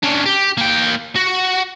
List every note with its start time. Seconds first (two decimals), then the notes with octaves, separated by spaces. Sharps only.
0.03 C#4 D4
0.26 G4
0.57 A#3 G5
1.16 F#4